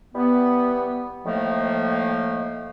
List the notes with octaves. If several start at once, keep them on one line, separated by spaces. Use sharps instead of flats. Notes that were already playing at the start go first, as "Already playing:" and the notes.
E3 G3 B3
A2 D#3 F3 A3 A#3